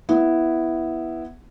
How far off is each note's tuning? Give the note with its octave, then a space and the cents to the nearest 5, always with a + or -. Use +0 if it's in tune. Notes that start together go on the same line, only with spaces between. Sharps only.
B3 +0 E4 +0